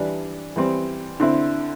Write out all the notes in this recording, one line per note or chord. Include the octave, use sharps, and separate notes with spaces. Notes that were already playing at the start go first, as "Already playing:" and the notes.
Already playing: E3 G3 D4
E3 G3 C4
D3 C4 E4